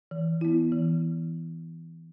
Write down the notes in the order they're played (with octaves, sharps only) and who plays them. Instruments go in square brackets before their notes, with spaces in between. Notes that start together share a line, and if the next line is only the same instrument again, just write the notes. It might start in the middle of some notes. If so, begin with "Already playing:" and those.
[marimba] E3
B3 E4
E3